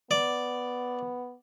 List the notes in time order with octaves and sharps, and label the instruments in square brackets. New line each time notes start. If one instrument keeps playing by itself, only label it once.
[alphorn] B3 [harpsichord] D5